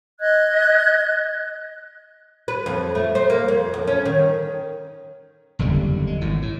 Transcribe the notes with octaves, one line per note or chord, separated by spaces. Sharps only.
D#5 F#6 G#6
B4
F2
A3
C5
A#3
F2
F2
C#4
D#3
F#1 E2 D3 G3
G#3
G#1 A2
A2